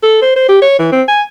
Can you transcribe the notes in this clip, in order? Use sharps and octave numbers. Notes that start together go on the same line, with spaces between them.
A4
C5
C5
G4
C#5
E3
C4
G#5